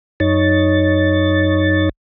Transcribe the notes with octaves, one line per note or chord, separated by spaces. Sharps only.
F#2 D#4 C#5 A6